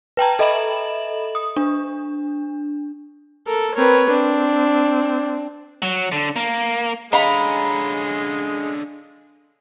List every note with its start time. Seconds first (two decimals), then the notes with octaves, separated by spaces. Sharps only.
0.17 B4 G5 A5 A#5
0.39 A4 D#5 E5 B5 E7 F#7
1.35 D#6
1.57 D4
3.47 A4 A#4
3.76 C4 A#4 B4 C#5
4.10 C4 D4
5.82 F#3
6.12 D3
6.36 A#3
7.13 D3 G#3 C#4 D#5 F5 A#5 B5